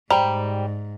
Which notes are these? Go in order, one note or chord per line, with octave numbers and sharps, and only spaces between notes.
G#2 G3 C5 D5 G5 A#5